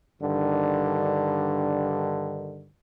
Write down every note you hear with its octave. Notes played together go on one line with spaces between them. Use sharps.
G2 D3 D#3